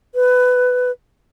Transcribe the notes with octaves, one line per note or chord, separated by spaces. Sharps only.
B4